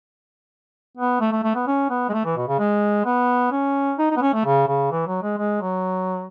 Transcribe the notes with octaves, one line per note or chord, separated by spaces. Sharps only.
B3
A3
A3
A3
B3
C#4
B3
G#3
A3
E3
B2
C#3
G#3
B3
C#4
D#4
D#4
B3
C#4
A3
C#3
C#3
E3
F#3
G#3
G#3
F#3